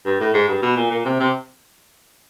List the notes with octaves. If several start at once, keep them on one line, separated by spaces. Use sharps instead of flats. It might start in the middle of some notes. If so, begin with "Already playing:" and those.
G2
A2
G#2
G2
B2
A#2
A#2
C3
C3